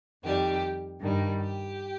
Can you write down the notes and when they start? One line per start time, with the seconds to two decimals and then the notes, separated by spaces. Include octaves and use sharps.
0.23 F2 D#3 G3 G4
1.00 G2 D#3 G3
1.39 G4